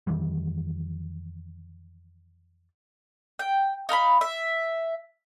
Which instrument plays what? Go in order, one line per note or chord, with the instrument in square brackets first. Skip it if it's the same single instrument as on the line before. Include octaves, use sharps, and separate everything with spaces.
[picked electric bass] F2 D#3 E3 G3
[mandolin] G5
D#4 F5 A#5 B5
E5